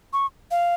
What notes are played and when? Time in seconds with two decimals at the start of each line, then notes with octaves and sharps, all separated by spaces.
0.13 C#6
0.51 F5